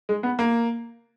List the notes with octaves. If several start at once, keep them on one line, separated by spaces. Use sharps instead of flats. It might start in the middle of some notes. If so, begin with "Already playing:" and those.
G#3
B3
A#3